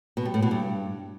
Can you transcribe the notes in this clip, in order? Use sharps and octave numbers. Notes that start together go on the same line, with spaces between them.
B2
G3
A2
B2
G2